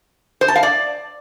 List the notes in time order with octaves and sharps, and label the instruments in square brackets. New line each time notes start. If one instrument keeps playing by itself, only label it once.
[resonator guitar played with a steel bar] C5
A5
F5
D5